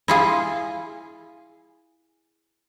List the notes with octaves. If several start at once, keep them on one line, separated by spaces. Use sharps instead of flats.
E4 F4 G#4